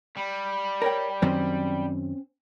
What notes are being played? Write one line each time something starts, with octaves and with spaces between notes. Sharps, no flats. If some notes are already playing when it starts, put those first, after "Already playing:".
G3
A#4 C#5 G5
F#2 D#3 F#3 C4 C#4 C5